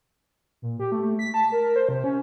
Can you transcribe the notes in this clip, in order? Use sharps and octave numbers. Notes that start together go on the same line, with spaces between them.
A#2
G4
A3
A3
B6
A5
A#4
C5
C3
C#4